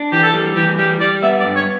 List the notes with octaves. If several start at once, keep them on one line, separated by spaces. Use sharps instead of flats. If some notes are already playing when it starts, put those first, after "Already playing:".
Already playing: D4
E3 G4
A4
G3
E3 G4
G3 G4
G3 D5
B3 E5
D5
G2
C#5